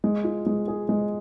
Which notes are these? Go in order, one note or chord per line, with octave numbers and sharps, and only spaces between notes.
G#3
F4
G#3
G#4
G#3